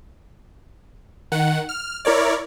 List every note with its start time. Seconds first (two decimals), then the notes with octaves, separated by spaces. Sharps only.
1.32 D#3 F#5
1.69 F6
2.05 E4 A#4 C#5 D5